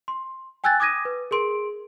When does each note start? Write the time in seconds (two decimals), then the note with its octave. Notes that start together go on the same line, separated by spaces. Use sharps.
0.08 C6
0.64 G5 G#5 E6 F#6 G#6 A6
0.80 D6 D#6 G#6 A#6 D#7
1.05 B4
1.31 G#4 A#4 C6 D7